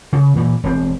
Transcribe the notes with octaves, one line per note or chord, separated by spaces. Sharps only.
C#3
A#2 E3
E1 C4